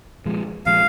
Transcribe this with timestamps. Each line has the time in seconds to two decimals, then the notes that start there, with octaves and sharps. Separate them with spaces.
0.26 A#2 F3 G#3
0.66 A#2 F3 G#3 F5